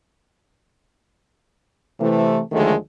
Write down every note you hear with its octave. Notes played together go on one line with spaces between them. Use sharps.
C3 E3 A3
D#2 D3 D#3 F3 G#3 A3